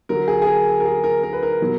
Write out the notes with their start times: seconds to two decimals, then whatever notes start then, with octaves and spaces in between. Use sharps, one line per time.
0.09 D3 F#3 A#4
0.28 G#4
0.42 G#4
0.46 A#4
0.80 A#4
0.85 G#4
1.04 A#4
1.23 A#4
1.33 B4
1.43 A#4
1.61 B2 F#3